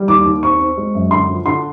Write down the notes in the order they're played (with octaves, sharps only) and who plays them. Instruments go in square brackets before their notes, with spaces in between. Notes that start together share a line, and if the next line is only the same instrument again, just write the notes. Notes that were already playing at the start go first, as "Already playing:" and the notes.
Already playing: [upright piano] G3
D#2 D6
D#2
C4 C#6
C4
G#3
F#2
D3 C6
F3
D3 C6